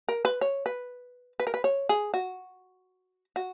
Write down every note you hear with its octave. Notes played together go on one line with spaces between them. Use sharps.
A#4
B4
C#5
B4
B4
A#4
B4
C#5
G#4
F#4
F#4